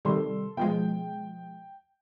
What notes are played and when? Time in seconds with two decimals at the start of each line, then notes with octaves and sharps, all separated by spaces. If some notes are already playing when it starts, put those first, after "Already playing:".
0.05 C3 D#3 G3 A4 C6
0.57 B2 F3 G#3 G5